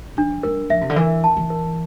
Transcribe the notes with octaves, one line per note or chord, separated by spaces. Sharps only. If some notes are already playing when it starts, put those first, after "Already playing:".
F3 D4
G3 A#4
F3 E5
C3
D3
E3 A#4
A5
E3
A#4